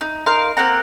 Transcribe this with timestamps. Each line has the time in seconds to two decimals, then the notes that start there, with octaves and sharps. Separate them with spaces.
0.01 D#4
0.26 D#4 A#4 F5 C6
0.57 A#3 C4 F#5 A#5